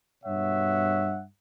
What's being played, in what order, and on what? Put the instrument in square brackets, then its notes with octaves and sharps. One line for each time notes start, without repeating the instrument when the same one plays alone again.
[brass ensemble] G2 B2 C#5 E5 F#5